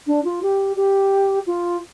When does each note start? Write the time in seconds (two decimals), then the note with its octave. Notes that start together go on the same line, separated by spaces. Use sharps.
0.06 D4
0.24 F4
0.42 G4
0.76 G4
1.46 F4